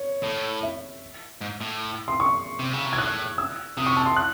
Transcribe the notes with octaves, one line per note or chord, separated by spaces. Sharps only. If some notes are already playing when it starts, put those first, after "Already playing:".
Already playing: C#5
A2
E5
G#2
A2
C6
C#6
C3
C#3
C3
G#6
A2 F#6
E6
C3 D#6
C#6
A5
C6
F#6